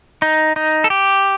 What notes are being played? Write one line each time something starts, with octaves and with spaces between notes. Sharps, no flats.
D#4
D#4
A4
G4